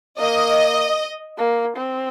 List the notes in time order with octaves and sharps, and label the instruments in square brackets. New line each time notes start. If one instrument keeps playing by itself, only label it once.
[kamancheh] A#3 [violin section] D#5
[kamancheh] A#3
C4